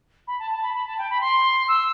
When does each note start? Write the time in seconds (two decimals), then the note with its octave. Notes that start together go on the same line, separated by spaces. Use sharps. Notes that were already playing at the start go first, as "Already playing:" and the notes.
0.27 B5
0.39 A5
0.51 A5
0.63 B5
0.74 B5
0.86 A5
0.98 G5
1.10 B5
1.21 C6
1.68 E6